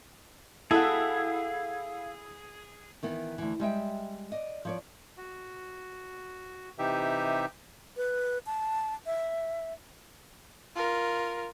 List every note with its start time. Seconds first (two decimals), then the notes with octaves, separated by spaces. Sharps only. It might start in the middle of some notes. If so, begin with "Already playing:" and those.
0.71 E4 F#4 G#4 A4 F5
3.03 D#3 E3 B3
3.38 D2 E3
3.60 G3 G#3 E5 G5
4.32 D5 D#5
4.65 F3 C#5 D5
5.17 F#4
6.79 C3 E3 D#4 G4 E5
7.97 B4
8.46 A5
9.06 E5
10.76 F4 A#4